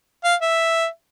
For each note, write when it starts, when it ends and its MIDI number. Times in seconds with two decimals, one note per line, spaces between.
0.24 0.35 77
0.42 0.87 76